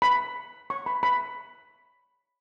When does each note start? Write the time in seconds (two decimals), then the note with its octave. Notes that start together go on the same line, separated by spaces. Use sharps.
0.02 B5
0.70 C#6
0.86 B5
1.03 B5